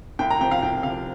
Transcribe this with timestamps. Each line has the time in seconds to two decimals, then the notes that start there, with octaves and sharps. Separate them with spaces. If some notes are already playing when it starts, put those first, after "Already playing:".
0.19 C2 G5
0.30 A#5
0.41 C3 F3 G5
0.51 F5
0.62 C2 G5
0.83 C3 F3 F5